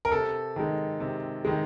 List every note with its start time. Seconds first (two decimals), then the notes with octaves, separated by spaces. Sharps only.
0.05 A#4
0.12 C3 A4
0.56 D#3 G#3
1.00 C3
1.45 D#3 G#3